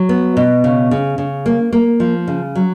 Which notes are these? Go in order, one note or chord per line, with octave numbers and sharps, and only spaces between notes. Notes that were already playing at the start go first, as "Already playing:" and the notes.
Already playing: F#3
B3
B2
C#3
C#3
C#3
A#3
A#3
F3
C#3
F#3